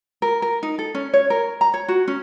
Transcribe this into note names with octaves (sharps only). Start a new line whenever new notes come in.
A#4
A#4
D#4
A4
C#4
C#5
A#4
A#5
C#5
F#4
C#4